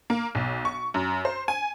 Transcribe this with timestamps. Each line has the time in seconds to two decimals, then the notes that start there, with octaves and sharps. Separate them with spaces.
0.10 A#3
0.35 B1
0.65 C#6
0.94 F#2
1.25 C5
1.48 G#5